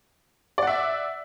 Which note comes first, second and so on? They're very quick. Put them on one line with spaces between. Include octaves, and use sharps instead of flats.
D5 F#5 E5